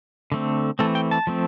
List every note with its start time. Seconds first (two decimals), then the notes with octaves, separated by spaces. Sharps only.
0.32 D3 A3 C4
0.79 E3 A3 C4 A4
0.95 G5
1.11 A5
1.27 F3 A3 C4